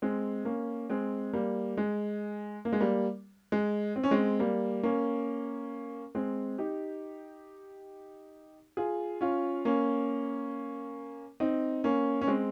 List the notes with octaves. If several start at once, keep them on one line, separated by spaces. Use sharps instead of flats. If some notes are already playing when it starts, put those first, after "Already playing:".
G#3 C4
A#3 C#4
G#3 C4
G3 A#3
G#3
A#3
G#3
G3 A#3
G#3
C4
C#4
G#3 C4
G3 A#3
A#3 C#4
G#3 C4
D#4 G4
F4 G#4
C#4 F4
A#3 C#4
C4 D#4
A#3 C#4
C#4
G#3 C4